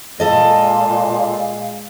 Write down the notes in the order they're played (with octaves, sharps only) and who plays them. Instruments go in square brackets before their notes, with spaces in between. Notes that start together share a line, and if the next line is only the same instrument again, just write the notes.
[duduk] A#2 [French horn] G#3 [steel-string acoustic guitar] A4 D#5 [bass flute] F5